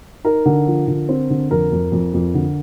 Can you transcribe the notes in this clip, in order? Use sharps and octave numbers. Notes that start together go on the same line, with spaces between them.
D#4 A#4
D3
F3
D3
C4
D3
F2 A#4
F2
F2
F2
D3